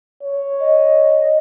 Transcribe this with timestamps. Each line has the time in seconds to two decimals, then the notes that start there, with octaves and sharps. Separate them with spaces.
0.23 C#5
0.60 D#5